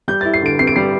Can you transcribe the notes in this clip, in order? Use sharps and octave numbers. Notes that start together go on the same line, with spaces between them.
G3 G6
E4 A6
C7
D3 D7
C4 C7
D7
G3 C7